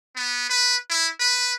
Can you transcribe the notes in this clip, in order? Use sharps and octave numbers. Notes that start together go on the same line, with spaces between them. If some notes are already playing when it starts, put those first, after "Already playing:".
B3
B4
E4
B4